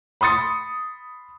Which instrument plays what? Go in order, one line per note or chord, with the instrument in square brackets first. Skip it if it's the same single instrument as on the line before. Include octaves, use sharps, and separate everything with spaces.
[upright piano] B5 C6 D#6 A6 C#7